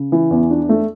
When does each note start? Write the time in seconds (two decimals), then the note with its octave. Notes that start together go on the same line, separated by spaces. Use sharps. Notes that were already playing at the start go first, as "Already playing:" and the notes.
Already playing: C#3
0.12 E3
0.31 E2
0.50 D4
0.69 A3